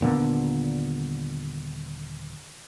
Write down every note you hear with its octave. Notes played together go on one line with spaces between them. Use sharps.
D#1 A#2 D3 B3